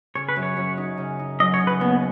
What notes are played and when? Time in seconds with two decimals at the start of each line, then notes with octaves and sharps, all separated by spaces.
0.15 C#3 C#5
0.29 B4
0.36 F#2
0.43 C#5
0.57 F#2
0.77 D#4
0.98 C#3
1.19 D#4
1.40 F#3 D#5
1.54 C#5
1.60 C#3
1.67 B4
1.81 D#2 B3